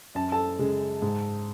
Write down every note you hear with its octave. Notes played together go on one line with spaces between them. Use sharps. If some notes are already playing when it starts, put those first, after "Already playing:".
F#2 A5
A4 A5
C#3 G#3
G#2